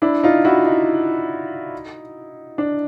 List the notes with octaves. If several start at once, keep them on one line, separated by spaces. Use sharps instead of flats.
D4 E4
D#4 F4
E4 F#4
D#4
D4